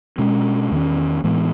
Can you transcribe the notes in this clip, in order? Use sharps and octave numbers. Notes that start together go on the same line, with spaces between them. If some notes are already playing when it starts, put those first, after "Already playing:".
B2 G#3 C#4
E2 D#3 A3 C#4
A2 E3 G#3 B3